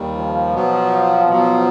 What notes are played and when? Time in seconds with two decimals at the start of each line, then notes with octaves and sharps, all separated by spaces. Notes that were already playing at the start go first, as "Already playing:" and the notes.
Already playing: D#2 D#3 G3
0.17 F3
0.54 B2 F#3 B3
1.29 B2 F#3 B3